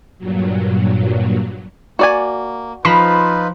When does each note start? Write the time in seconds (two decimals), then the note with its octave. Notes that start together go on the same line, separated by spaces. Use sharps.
0.18 G2 A#2 F#3
1.99 A#3 F#4 D5 G#5
2.85 F3 D#4 F4 B4 B5